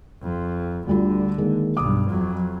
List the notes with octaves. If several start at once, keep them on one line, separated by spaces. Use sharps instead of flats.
F2
D2 D3 G3 F4
D#3 G#3 A#3
B1 G2 D6 D#6
F2 F#3